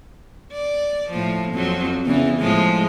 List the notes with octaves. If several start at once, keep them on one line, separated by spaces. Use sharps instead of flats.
D5
A2 F3
F2 F#3
E2 C#3 E3
A2 F3 G#3